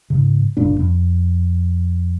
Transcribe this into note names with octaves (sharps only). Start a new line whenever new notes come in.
G#2 C#3
F#1 C2 A#2 D4
F2